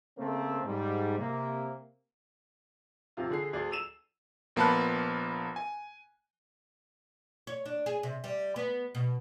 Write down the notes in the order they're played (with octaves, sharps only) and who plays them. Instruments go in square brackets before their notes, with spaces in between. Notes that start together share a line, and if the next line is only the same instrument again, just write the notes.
[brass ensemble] C#3 A3 A#3 C4
G#2 G3
C3 A#3
[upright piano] D#1 C3 F4
D3 G#4 C7
D2 G#4 D5
E6 D#7 E7
[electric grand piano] A#1 A#3 B3 A5 B5 F#6
G#5
[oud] C#5
D4
G#4
C3
G3
B3
B2